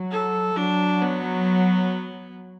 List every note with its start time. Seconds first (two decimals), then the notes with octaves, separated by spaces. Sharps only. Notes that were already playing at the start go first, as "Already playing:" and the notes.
Already playing: F#3
0.11 A4
0.56 F#3 D4
1.02 B3